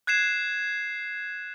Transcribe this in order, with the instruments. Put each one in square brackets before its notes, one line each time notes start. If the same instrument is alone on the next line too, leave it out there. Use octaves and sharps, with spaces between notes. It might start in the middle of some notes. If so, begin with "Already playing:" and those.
[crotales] F#6 G#6 C7 E7